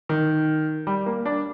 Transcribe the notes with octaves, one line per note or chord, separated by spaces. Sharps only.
D#3
G3
A#3
D4